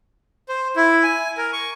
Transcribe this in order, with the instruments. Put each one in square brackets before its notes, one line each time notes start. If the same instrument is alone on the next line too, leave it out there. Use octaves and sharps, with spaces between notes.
[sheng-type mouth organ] C5
E4
G#5
A#4
C#6